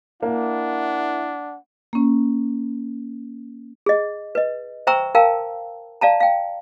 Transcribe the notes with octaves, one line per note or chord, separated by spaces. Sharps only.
A#3 D4 E4 F#5
A#3 C#4
G#4 D#5
B4 D#5
C5 E5 G5 A#5 C#6 E6
A#4 F5 G5 A5 A#5 E6
D5 F5 A5 A#5
F5 G5